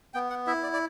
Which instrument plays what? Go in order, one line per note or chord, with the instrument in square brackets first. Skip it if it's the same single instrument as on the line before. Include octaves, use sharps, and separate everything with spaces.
[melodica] B3 G5
F#5
E4 E5
D5
D5